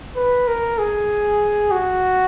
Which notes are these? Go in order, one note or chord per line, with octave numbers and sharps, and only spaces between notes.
B4
A#4
G#4
F#4